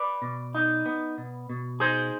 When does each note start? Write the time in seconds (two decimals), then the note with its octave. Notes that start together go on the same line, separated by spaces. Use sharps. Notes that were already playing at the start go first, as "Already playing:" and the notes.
Already playing: B4 D5
0.22 B2
0.55 D#4
0.86 B3
1.18 B2
1.50 B2
1.80 D#4 G#4 C5